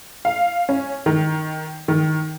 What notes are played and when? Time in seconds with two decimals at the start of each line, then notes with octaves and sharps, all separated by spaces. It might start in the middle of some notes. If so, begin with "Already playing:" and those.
0.25 F5
0.69 C#4
1.06 D#3
1.88 D#3